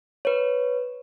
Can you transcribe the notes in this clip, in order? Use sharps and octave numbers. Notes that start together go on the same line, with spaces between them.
B4 C#5